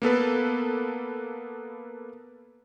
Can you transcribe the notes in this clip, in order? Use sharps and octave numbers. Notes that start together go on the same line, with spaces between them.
A#3 B3 A4 B4